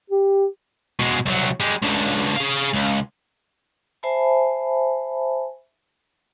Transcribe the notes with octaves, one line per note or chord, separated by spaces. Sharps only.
G4
B2 G#3
C2 F#3
G#3 G4
C#2 D3
G#4 F5
C#2
C5 E5 G#5 A5 B5